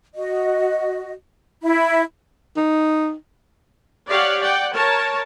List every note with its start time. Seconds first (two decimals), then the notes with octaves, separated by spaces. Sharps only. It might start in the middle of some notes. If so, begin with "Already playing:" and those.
0.14 F#4 D#5
1.63 E4 E5 B5
2.57 D#4
4.08 G4 C#5 D5 F5 F#5
4.40 D5 F#5 G5
4.73 A#4 C#5 A5